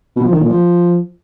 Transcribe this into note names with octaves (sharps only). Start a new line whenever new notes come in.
B2
F3
D#3
A#2
F3